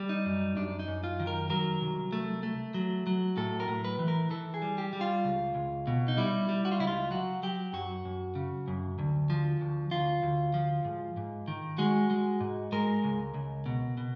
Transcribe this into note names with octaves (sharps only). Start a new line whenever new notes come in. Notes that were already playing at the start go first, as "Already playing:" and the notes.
Already playing: G3
D#4
F#2
F#2 D4
D#4
F#2
F4
D#3
A#4
F#3 A#4
C2
A3
A3
F#3
F#3
A2 A4
A#4
A2
B4
E3
A#4
E3 A4
G#4
G3
G4
G3
F4
C#2
C#2
B2
D#4
G3 E4
G3
F#4
F4
C#2 E4
F4
F#3 F#4
F#3 G4
F#2 F#4
F#2
C#3
F#2
D2
F3
D2
D2 F4
D2
F3
G#2
G#2
D#3
G#3 F#4
G#3
G#2
G#3 A#4
C#2
C#2
B2
B2